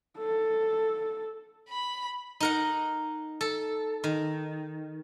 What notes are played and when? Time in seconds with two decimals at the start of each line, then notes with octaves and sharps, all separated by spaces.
0.18 A4
1.69 B5
2.40 D#4 A#4 F#5
3.41 A4
4.04 D#3